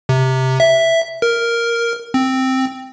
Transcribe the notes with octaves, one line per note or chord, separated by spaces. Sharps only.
C3
E5
A#4
C4